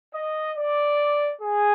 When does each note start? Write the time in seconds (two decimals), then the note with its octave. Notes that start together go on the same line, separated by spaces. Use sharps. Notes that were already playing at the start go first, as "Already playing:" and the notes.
0.13 D#5
0.56 D5
1.40 G#4